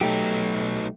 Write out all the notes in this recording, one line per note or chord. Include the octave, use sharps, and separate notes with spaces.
B1 F#3 A3 D#4 G4